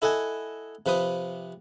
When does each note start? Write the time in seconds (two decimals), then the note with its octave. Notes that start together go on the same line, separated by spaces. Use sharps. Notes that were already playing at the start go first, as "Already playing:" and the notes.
0.02 E4 A4 D#5 F#5 G#5
0.86 C3 F3 B4 C5 D#6